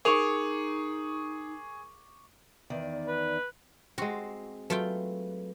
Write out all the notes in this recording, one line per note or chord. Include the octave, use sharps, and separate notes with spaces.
D#4 G#4 A#4 C#6 D6 F7
E2 D#3 D5
B4
G#3 C4 F#4
F#3 A3 F4 A4 B4 G5